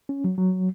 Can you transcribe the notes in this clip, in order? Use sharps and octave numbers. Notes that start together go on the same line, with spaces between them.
C#4
F#3
F#3